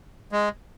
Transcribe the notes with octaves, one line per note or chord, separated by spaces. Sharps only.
G#3